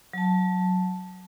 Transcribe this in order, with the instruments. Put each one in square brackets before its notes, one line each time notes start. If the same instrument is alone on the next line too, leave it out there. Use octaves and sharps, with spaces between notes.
[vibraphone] F#3 A5